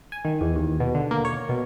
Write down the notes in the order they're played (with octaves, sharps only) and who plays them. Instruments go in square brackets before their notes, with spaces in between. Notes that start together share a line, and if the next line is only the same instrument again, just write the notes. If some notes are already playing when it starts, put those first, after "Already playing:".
[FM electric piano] G#5
D#3
E2
D#2
B2
D3
A#3
C#5
B2